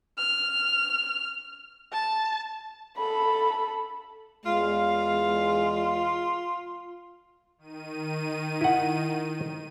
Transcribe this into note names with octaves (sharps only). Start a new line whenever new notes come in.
F6
A5
A4 B5
E2 G#3 F4 F5
D#3 D#7
E4 F#5